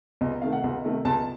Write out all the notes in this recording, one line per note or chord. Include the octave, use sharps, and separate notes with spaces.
C#2 D#5
D#5
C3 D#3 A3 F5
F#5
C#2
C3 D#3 A3
C#2 A5